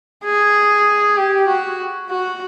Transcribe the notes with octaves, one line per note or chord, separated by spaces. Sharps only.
G#4
G4
F#4
F#4